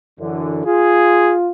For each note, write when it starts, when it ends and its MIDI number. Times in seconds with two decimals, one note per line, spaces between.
0.20 0.66 42
0.20 0.66 50
0.20 0.66 52
0.66 1.51 65
0.66 1.36 68